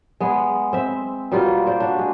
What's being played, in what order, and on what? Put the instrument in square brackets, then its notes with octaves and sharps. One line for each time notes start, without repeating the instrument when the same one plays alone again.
[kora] G#3 B3 G#4
C4 E5
B2 G3 A#3 F4
C5 D5
D4 F#4
G#3